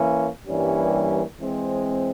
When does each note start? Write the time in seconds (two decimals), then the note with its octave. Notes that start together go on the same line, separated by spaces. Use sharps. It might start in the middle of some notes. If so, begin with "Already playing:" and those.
Already playing: E3 A#3 C#4
0.46 G2 E3 G3 A#3 C#4
1.39 E3 G#3 C4